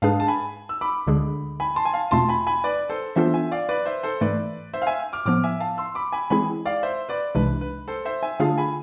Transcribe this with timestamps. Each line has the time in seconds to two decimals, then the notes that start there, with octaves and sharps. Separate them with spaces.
0.02 G#2 G#3 D4 G#4 B4 F5 A5
0.20 A5
0.28 G#5 B5
0.69 E6
0.81 B5 D6
1.07 D2 D3 G#3 D4 G#4
1.60 G#5 B5
1.76 A5 C6
1.85 G#5
1.94 F5 A5
2.11 E2 B2 A3 C4 F4 A5 C6
2.29 G#5 B5
2.47 G#5 B5
2.64 B4 D5
2.90 A4 C5
3.16 E3 B3 D4 F4 A4 C5 E5
3.34 E5 G#5
3.52 D5 F5
3.69 B4 D5
3.86 C5 E5
4.03 A4 C5
4.21 G#2 E3 A3 B4 D5
4.73 C5 E5
4.82 F5
4.87 E5 G#5
5.13 D6 F6
5.26 A2 F3 B3 D6 F6
5.44 E5 G#5
5.60 F5 A5
5.78 C6 E6
5.95 B5 D6
6.13 G#5 B5
6.30 E3 G#3 C4 E4 G#4 G#5 B5
6.65 D5 F5
6.83 C5 E5
7.09 B4 D5
7.35 C2 C3 E3 G#3 D4 B4
7.61 B4
7.88 A4 C5
8.05 C5 E5
8.23 E5 G#5
8.40 D3 A3 D4 F4 G#4 F5 A5
8.58 G#5 B5